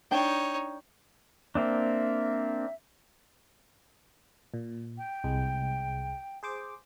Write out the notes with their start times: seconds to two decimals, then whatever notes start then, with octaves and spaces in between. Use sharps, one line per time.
0.11 D4 D#4 C#5 G5 A5
1.55 A#3 C4 D4 E5
4.54 A#2
4.97 G5
5.24 C2 G#3
6.43 G#4 C5 D6